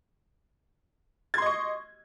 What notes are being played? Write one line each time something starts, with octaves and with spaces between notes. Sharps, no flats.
D#5 C6 C#6 G#6